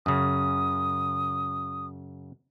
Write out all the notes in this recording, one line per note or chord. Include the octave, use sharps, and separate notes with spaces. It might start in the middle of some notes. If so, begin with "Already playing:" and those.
F#2 C#3 D#6